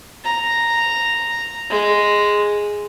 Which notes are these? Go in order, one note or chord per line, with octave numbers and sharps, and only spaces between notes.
A#5
G#3